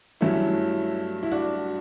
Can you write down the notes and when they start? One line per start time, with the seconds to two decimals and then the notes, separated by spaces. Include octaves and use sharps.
0.21 G2 F#3 A3 C#4 E4
1.23 E4
1.31 D4 F#4